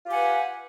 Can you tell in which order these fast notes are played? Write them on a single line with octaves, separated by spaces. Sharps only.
F4 G4 G#5 F#5 B4